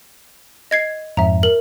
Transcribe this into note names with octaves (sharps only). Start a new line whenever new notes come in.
D#5 G#6 C7
F2 G#2 E5 A#5
A#4 F#7